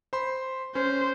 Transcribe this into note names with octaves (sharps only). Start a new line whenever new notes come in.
C5 B5 C6
C#4 C5